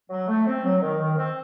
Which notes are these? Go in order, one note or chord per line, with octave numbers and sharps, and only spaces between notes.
F#3
A3
C4
F#3
D#3
D#3
C4